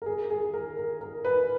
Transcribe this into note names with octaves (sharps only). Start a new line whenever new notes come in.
A#4
G#4
G#4
A#4
A#4
A#4
B4